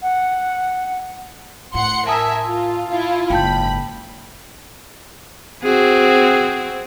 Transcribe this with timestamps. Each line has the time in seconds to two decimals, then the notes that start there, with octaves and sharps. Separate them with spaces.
0.01 F#5
1.74 A2 F#5 C6 C#7
2.07 A#4 E5 G#5 A5 D#6 E6
2.45 F4
2.87 E4 F4
3.30 F#1 G#2 G5 A5 B5 G6
5.63 C4 F#4 G#4